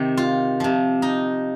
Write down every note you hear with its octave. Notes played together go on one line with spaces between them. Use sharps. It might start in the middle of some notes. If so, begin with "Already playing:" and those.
Already playing: C3 D#3
F4
C3 F3
D#4